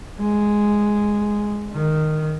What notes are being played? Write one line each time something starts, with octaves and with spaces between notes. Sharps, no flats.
G#3
D#3